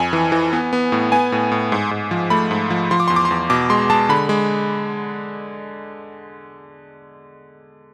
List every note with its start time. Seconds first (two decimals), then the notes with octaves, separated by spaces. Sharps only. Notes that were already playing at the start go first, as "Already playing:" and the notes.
Already playing: F2 G#5
0.13 E3
0.32 E3
0.53 B3
0.73 B3
0.92 A2
1.12 B3 G#5
1.32 A2
1.52 A2
1.72 G#2
1.91 G#2
2.11 F3
2.30 A3 B5
2.51 G#2
2.70 F3
2.91 F3 C6
3.00 D6
3.08 E2 C6
3.16 D6
3.25 C6
3.31 E2
3.50 B2 D6
3.70 G#3 C6
3.90 G#3 A5
4.09 D3 B5
4.29 G#3